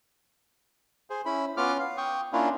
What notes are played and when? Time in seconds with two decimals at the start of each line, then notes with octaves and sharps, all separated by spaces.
1.10 G#4 C5
1.26 C#4 E4 B5
1.57 B3 C#4 F4 D6 F6
1.80 F5
1.97 G5 C#6 D#6
2.33 A#3 C#4 D4 E4 F4